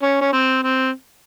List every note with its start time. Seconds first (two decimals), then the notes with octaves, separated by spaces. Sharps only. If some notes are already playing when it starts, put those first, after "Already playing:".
0.03 C#4
0.21 C#4
0.33 C4
0.63 C4